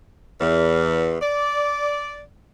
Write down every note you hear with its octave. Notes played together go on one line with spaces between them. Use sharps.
E2
D5